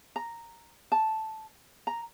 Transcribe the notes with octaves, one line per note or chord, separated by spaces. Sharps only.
A#5
A5
A#5